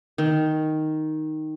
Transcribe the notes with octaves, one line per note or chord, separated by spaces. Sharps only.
D#3